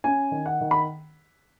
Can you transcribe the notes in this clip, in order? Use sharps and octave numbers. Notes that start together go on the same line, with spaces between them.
C#4 G#5
D#3
F#5
D#3
B5